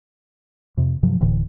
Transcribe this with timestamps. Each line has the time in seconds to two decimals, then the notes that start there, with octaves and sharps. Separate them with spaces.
0.77 F2 C3
1.03 G2 C3 F3 F#3
1.21 D1 A2 D3 E3